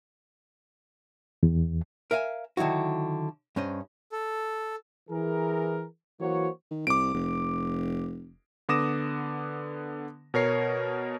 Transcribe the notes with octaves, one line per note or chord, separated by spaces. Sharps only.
E2
A#4 E5 F5 G#5
D3 D#3 F#3 E4 F#4
G2 C#4 C5 D#5
A4
E3 G#4 A#4
E3 F#3 A#3 F#4 C5 C#5
D#3
C2 D6 D7
F1
D3 B3 D6 D#6 A#6 E7
B2 A#4 C#5 C7